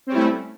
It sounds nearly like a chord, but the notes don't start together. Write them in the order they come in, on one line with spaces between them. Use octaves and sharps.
C4 C#4 G3 E4 A3